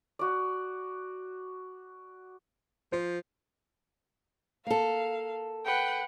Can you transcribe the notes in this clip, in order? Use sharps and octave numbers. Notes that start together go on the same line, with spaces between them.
F#4 D5
F3 C5
A#3 A4 F5
B4 F#5 G5